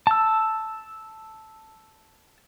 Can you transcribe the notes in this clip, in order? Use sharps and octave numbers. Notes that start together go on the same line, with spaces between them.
A5 E6